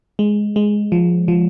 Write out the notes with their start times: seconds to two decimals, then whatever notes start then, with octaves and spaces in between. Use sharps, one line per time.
0.19 G#3
0.56 G#3
0.92 F3
1.28 F3